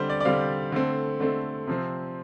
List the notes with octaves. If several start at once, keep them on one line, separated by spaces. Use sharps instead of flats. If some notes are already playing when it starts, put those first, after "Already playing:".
Already playing: D3 G3 C4 G4 C5
D5
D5
D3 G3 C4 F5
D3 A3 C4
D3 A3 C4
C3 F3 C4